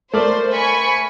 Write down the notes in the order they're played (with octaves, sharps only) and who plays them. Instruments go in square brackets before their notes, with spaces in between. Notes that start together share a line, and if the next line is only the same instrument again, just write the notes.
[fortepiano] A3 A#4 D5 [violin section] C5
[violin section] G#5 B5 C#6